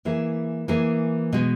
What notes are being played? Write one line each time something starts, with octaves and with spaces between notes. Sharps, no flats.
E3 A#3 E4 G#4
E3 A#3 E4 G#4
B2 G#3